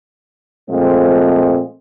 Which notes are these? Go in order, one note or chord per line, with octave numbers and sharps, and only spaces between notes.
A#2 F3 G#3 A3 C4